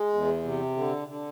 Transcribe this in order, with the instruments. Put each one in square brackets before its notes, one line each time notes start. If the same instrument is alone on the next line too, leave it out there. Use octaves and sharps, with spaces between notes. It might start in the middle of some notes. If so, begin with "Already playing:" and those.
Already playing: [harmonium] G#3
E2
C3
D3
D3